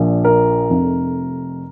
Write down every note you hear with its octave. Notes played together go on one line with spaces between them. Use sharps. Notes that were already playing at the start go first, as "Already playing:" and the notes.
Already playing: A#1 A#2 F3
A#4
F1 F2 C3